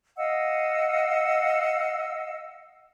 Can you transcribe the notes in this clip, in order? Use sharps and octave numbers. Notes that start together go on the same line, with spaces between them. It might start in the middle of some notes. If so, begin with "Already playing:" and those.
D#5 F5 F#5 E6